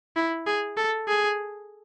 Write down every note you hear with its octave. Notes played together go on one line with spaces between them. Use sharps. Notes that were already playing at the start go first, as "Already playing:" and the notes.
E4
G#4
A4
G#4